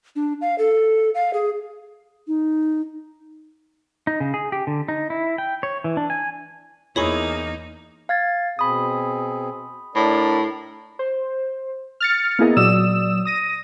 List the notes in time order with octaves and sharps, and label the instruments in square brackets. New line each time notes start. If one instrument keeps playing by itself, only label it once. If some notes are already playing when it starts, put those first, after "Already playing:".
[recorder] D4
F5
A4
F5
G#4
[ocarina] D#4
[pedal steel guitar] D#4
C#3
G#4
G4
D3
D#4
E4
G5
C#5
E3
D4
G#5
[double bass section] E2 [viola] A#3 D#4 [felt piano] E4 G#4 [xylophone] C#5 B5 C#6
[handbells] F5 G#6 A6
[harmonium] B2 C4 G#4 [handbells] B5 D#6
[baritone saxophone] A2 [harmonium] D4 A#4 D5
[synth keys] C5
F6 A6 C#7
A#3 B3 E4 G#4 A#4 D#5
A#2 F#3 D5 D#6 E6 E7
D#6 A#6 D#7